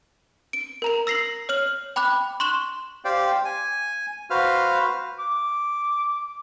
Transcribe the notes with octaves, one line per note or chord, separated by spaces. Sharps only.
D7
A#4 A#5 F7
E6 A#6 C7 F7 F#7
C#5 F6 F#7
G5 B5 D6 F#6
C6 C#6 F#6 E7 G7
G4 C5 D5 F5 G5
G#5
F#4 B4 C5 F5 F6
D6